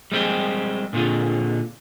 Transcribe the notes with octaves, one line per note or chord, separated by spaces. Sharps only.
G3 G#3 C4 G4 G#4
A#2 D3 C4 F4 G#4